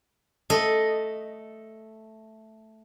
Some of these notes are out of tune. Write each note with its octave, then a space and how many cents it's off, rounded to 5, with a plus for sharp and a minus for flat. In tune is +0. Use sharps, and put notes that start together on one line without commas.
A3 +0 A4 +0 D#5 +0